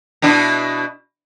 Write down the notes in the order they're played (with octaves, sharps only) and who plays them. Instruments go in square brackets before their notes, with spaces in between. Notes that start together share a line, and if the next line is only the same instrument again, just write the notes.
[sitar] B2 D4 E4